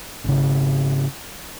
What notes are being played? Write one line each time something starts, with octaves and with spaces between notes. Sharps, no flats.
G#1 C#3